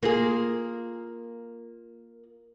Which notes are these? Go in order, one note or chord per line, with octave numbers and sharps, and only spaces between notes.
A#3 F4 G#4